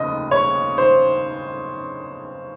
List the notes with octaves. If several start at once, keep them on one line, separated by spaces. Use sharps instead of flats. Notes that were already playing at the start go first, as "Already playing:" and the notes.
Already playing: F1 D#2 C#3 D#5
C#5
C5